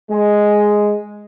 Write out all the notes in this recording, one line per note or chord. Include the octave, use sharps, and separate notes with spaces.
G#3